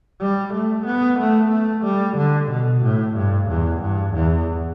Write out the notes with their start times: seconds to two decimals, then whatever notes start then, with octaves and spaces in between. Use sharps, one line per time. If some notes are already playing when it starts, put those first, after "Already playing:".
0.21 G3
0.53 A3
0.86 B3
1.19 A3
1.51 A3
1.85 G3
2.17 D3
2.50 B2
2.84 A2
3.16 G2
3.49 E2
3.82 G2
4.14 E2